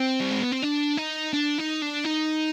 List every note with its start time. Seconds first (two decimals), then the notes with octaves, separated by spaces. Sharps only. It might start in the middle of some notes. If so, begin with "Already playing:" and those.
Already playing: C4
0.20 G3
0.31 G#3
0.41 B3
0.52 C4
0.63 D4
0.97 D#4
1.33 D4
1.58 D#4
1.82 D4
2.05 D#4